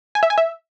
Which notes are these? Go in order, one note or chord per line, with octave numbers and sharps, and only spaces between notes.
G#5
E5
G#5
E5